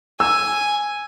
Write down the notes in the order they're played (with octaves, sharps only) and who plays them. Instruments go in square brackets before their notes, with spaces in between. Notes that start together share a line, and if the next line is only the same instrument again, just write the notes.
[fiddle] G#5 [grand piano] E6